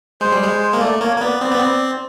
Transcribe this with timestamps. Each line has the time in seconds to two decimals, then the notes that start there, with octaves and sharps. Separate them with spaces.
0.21 G#3 C5
0.32 G3
0.43 G#3
0.73 A#3
0.81 A3 D5
1.01 A#3 C#5
1.16 A#3
1.21 B3 D5
1.41 C4 D5
1.50 B3
1.59 C4